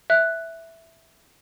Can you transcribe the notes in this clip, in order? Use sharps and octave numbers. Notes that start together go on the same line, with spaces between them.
E5 F#6